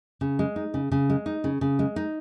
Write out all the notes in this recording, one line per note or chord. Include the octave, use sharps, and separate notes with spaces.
C#3
G#3
D#4
C#3
C#3
G#3
D#4
C#3
C#3
G#3
D#4